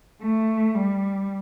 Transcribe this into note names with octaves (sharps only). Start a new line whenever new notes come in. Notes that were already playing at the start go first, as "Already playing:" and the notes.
A3
G3